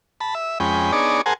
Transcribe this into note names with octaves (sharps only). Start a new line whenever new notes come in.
A5 B5
E5
F2 G#3 C#4 G5 B5
B3 D4 D#4 G#4 C#5 D5
G#4 A#4 C5 F#5 G#5 A5